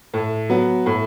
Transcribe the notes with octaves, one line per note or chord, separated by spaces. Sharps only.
A2
F#3 B3
A2